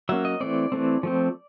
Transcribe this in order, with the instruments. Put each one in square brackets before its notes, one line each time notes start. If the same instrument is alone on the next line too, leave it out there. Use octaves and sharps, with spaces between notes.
[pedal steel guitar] F#3 A#3 C#4 E5
D#5
E3 A3 C4 D5
E3 A3 C4
F3 A3 C4